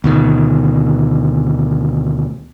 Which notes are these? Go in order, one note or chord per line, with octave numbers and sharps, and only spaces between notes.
D2 B2 D#3